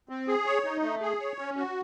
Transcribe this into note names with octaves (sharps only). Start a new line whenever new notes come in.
C4
G#4
C#5
D#4
A3
G#4
C#5
C#4
F#4